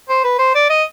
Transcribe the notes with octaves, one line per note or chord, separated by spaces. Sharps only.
C5
B4
C5
D5
D#5